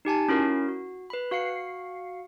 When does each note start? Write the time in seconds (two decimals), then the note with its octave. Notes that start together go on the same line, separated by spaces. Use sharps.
0.05 D#4 G4 G#5 A5
0.28 C#4 E4 F#4 A#4
0.68 F#4
1.10 B4 B5
1.31 F#4 F5 C7 C#7